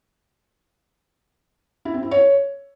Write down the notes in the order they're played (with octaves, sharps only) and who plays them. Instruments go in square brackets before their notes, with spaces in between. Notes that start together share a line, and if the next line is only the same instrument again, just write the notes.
[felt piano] E4
C4
E4
C#5